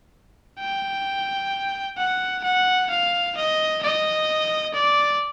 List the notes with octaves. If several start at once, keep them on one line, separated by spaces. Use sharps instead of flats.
G5
F#5
F#5
F5
D#5
D#5
D5